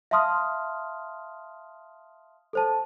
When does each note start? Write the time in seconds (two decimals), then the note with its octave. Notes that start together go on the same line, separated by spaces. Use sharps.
0.11 E5 F5 A5 C6 D#6 F6
2.53 A4 C5 A5